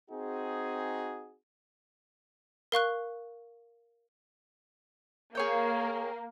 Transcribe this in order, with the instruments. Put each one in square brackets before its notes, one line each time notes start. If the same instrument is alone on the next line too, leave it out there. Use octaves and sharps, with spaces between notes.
[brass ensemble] C4 D#4 F#4 G#4
[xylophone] A#4 F5 C#6 F#6
[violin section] A#3 [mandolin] G#4 C#5 G5